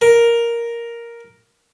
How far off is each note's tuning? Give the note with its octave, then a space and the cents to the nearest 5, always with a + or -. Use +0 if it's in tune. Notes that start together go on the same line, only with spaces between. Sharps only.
A#4 +5